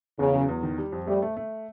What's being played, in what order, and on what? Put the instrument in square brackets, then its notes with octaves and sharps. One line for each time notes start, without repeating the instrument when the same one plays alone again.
[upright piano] E2 [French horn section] C#3
[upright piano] F#3
E2
D#3
G3
F2
[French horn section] G3 [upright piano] A3
[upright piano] A3
A3